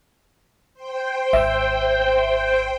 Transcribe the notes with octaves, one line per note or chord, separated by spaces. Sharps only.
C5 G5
G#1 E5